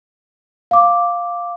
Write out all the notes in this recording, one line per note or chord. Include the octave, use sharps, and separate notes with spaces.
F5 D6